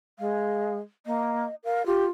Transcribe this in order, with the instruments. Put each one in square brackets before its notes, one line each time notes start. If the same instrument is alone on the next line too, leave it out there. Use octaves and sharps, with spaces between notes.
[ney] G#3 [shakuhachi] F5
[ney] A#3 [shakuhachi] D#5
[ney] A#4 [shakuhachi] F5
[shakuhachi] F4 [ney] G4